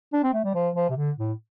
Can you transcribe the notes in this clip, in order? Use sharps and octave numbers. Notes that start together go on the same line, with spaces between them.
D4
C4
A3
G3
F3
F3
C3
D3
A2